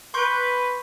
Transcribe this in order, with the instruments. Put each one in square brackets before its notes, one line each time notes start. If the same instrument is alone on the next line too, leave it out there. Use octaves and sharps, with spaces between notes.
[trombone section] B4 [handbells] C6 C#6 G6